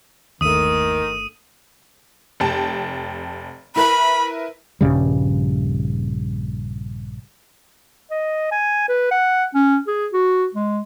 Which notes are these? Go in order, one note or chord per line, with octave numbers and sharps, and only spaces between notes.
G1 D#2 D#3 A3 D#6 D#7
F1 G5 A5
E4 A#4 B4 B5
A#1 G2 C#3 G3
D#5
G#5
B4
F#5
C#4
G#4
F#4
G#3